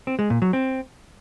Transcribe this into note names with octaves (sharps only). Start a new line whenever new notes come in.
C4
G#3
A#2
F#3
C4